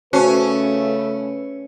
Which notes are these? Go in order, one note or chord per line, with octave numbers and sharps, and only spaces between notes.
C#3 A3 C#4 F#4 B4 C5 A5